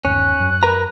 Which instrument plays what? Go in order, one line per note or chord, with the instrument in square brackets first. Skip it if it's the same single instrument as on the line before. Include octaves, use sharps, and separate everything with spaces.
[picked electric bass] G1 D#2 [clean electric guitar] C#4 [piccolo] F#6
[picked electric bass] F#2
[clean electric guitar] A#4 B4 A#5